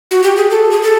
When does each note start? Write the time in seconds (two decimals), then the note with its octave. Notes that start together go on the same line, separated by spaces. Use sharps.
0.11 F#4
0.23 G4
0.37 G#4
0.51 A4
0.71 G#4
0.83 A4